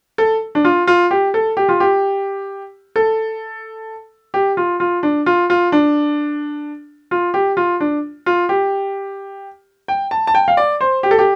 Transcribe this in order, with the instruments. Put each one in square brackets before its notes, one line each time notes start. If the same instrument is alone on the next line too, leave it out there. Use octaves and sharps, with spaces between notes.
[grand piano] A4
D4
F4
F4
G4
A4
G4
F4
G4
A4
G4
F4
F4
D4
F4
F4
D4
F4
G4
F4
D4
F4
G4
G5
A5
A5
G5
F5
D5
C5
G4
A4
G4